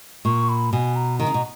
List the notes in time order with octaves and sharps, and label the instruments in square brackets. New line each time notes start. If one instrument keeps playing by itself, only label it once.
[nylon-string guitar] A#2 [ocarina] C#6
[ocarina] B5
[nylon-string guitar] B2 [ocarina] G#5
[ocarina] A#5
[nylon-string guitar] D#3 [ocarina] A#5
[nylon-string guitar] C#3
B2